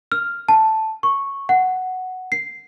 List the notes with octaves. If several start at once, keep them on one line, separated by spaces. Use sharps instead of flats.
F6
A5
C#6
F#5
C7